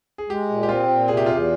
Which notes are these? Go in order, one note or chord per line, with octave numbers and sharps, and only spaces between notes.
G#4
G#3 G4
A#2
G4
C4 F4
A#2
C3 G#4
G4
E2 F4
G4